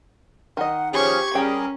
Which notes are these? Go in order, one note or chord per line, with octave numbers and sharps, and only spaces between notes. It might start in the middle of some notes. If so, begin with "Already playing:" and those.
D#3 D#5 F#5
F3 C#4 G4 G#4 C#6 G#6
G3 C#4 G#4 A#4 G5